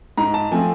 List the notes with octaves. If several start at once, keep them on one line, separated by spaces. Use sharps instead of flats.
G#2 A#5
A5
F3 A3 C4 G#5